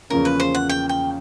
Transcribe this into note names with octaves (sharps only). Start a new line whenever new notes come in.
E2 C#3 F3 A#3 C#4 A#4
B4
C5
F#5
G5
G5